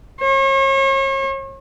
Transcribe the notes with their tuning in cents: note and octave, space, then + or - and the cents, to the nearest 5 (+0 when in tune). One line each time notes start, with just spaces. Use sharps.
C#5 -40